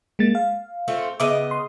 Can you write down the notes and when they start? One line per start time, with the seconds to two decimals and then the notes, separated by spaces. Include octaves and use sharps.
0.19 G#3 A#3 A6
0.35 F5
0.88 A3 C4 F4
1.20 C#3 B3 D#5 E5 D6
1.51 C6